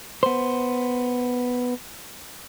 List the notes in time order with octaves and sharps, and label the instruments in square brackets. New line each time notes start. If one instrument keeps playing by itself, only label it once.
[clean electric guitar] B3 C5